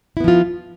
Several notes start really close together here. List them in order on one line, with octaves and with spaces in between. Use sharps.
E4 B3 F3 F4